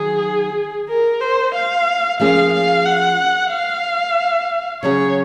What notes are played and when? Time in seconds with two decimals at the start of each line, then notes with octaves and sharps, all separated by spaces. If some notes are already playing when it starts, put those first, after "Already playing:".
Already playing: D#3 F#3 G#4
0.89 A#4
1.21 C5
1.54 F5
2.20 F3 A#3 C#4 G#4 F5
2.52 F5
2.85 F#5
3.51 F5
4.82 C#3 F#3 C#4 G#4 C#5